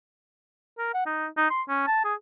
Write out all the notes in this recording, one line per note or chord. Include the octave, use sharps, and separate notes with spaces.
A#4
F#5
D#4
D#4
C6
C#4
A5
G#4